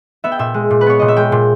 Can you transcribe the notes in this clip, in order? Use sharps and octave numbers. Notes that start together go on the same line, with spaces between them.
B3 E5
G5
A#2 E5
G#3
A#2
B4
B3 C#5
A#2 D#5
E5
G#3 G5
A#2